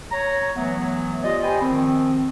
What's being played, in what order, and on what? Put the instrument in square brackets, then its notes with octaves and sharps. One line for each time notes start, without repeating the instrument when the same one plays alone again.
[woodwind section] C#5 A#5
E3 F#3 A3 B3
F4 G4 D5 D#5
G4 C5 G5 G#5 B5
D#3 F3 C4